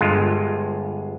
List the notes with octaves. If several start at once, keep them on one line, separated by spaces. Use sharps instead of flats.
G1 G2 G#3 F4